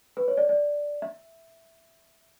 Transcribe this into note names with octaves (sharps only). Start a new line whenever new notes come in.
B4
C#5
D5
D5
E5